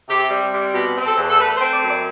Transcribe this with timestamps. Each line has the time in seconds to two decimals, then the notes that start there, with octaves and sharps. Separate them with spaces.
0.09 C3 G4
0.31 G3
0.53 C3
0.74 B2 G4
0.96 C4
1.07 A4
1.17 E2
1.29 A4
1.39 A3 B4
1.56 C5
1.61 C4
1.71 D5
1.83 F#2
1.88 D5